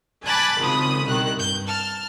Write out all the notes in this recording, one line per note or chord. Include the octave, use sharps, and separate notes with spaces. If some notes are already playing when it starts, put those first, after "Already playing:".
G#5 A5 B5 D6 F#6 A6
G#1 C#3 F3 B5 D#6
C2 B2 D#3 F#6
G2 G6
A5 F6